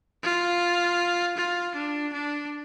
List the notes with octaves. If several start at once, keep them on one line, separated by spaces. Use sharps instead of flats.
F4
F4
D4
D4